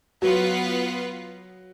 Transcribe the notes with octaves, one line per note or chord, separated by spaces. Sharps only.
F#3 B3 F4 B4 F#5